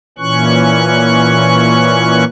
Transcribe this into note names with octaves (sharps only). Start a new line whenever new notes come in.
A#2 E3 C#4 C#6 F#6